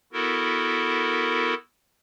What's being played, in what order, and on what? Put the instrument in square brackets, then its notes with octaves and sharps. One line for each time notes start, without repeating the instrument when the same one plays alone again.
[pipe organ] B3 E4 F#4 A4 A#4